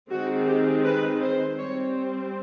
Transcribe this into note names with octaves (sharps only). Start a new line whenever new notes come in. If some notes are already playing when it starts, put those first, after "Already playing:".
D#3 G#3 C4 F#4
G4
B4
C5
G3 C4 C#5